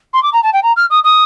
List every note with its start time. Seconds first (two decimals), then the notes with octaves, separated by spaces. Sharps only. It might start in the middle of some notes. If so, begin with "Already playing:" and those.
0.13 C6
0.23 D6
0.33 A#5
0.43 A5
0.53 G5
0.63 A#5
0.76 F6
0.90 D#6
1.04 D#6